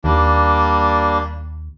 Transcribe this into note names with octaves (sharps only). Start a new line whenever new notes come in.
D#2 G3 A#3 D4